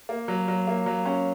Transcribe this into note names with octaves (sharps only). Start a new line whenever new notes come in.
A#3
F#3
F#3
A#3
F#3
C#4